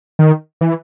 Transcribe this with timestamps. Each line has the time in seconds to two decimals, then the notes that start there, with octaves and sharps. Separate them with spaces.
0.19 D#3
0.61 E3